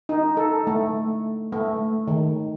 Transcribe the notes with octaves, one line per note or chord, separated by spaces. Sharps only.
D#4
A4
A3
A3
D#3